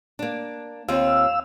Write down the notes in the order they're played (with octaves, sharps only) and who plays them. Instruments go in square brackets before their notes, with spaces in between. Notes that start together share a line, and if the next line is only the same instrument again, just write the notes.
[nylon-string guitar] A#3 D4
[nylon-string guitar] D#2 C4 F4 [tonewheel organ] F5 E6